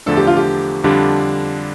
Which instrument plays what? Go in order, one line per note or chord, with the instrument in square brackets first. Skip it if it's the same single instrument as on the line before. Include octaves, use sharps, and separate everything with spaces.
[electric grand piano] E2 D3 F3 A3 D4 [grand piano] A4
[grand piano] G4
F4
G4
[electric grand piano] F2 D3 G3 D4 F4 [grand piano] G4